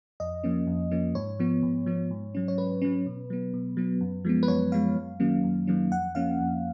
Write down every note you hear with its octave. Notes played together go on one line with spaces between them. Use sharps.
F2 D#5
F3 A#3 C#4
F2
F3 A#3 C#4
G#2 C#5
F3 B3
G#2
F3 B3
G#2
F#3 C#4
C#5
G#2 B4
F#3 C#4
B2
F#3 B3
B2
F#3 B3
F#2
F3 G#3 B3
B4
F#2 C#5
F3 G#3 B3 F5
F#2
D#3 F#3 A#3 C#4
F#2
D#3 F#3 A#3 C#4
F2 F#5
F3 A#3 C#4 F5
F2